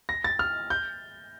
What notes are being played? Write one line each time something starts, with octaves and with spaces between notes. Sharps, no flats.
A#6
A6
F6
G6